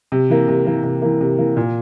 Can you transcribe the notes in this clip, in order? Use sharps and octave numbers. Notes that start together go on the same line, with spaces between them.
C3
E3 A#3
C3
E3 A#3
C3
E3 A#3
C3
E3 A#3
A#2